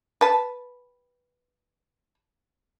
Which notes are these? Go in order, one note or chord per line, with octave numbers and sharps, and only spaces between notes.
B4 A5